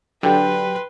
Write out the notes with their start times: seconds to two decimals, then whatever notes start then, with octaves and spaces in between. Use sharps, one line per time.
0.23 D3 F#3 G4 B4 G5 C6